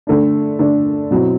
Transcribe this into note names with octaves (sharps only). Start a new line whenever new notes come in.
D3 A3 D4
D3 A3 D4
B2 F#3 C4 E4